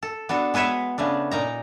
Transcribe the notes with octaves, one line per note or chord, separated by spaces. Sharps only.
A4
B3 D4 F#4 A4
G#3 B3 B4 C#5 E5
C#3 A3 B3 D4
A#2 D#4 A#5